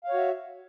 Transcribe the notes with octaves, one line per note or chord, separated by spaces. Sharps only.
F#4 C#5 E5 F5